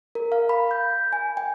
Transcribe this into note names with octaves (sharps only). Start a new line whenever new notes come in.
A#4
F5
B5
G6
G#5
G5